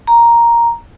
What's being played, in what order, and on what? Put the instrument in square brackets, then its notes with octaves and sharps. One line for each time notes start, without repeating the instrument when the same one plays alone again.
[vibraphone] A#5